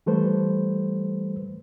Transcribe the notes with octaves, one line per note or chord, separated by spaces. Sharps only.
E3 G3 A3 A4 B4 C5